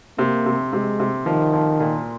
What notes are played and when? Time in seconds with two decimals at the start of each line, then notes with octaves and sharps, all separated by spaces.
0.18 C3 A#3
0.46 C3
0.72 C3 G#3
1.00 C3
1.26 D#3 F3
1.53 F3
1.80 A#2